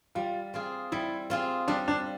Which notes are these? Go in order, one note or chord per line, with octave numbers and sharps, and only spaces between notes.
G3 F4
C4 F4 G#4
G3 E4
C4 F4 G#4
G3 D4
D4